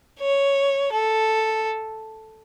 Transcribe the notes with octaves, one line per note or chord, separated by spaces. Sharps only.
C#5
A4